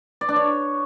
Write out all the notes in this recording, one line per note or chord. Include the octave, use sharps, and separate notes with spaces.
D5
D4
C#5